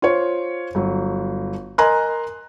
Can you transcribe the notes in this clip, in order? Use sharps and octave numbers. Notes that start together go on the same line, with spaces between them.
F4 C5 C#5
G1 F#3
A#4 D#5 G#5 A#5 C6 F#6